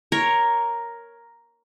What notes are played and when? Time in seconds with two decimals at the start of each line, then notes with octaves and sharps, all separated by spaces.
0.12 A#4 C#5